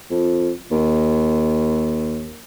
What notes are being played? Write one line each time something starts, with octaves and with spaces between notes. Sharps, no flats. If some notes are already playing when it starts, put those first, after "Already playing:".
F2
D#2